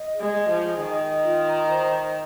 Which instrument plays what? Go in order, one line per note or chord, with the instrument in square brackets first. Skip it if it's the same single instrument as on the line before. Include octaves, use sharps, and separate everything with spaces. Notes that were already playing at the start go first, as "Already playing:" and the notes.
Already playing: [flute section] D#5
G#4
[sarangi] G#3
[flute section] D#5
[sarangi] F3
[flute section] G#4
[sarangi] D#3 [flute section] D#5
[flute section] D#5
F4
A#5
C5